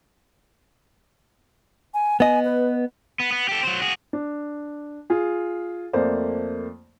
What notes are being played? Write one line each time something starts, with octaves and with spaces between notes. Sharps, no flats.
G#5
B3 D#5 G#5
B4
B3
B3
G4 A4
F#3 C5
F#4 G#4
D4
F4 G#4
F2 A3 A#3 C5 D5